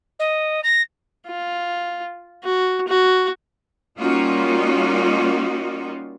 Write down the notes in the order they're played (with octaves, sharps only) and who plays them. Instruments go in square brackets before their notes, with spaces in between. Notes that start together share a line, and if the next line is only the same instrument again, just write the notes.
[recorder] D#5
A#6
[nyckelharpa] F4
F#4
F#4
[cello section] G3 A#3 C#4 D#4 F4 F#4